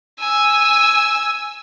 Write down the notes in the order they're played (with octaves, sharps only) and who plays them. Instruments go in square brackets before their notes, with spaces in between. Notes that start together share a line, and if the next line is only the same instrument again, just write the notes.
[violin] G#5 E6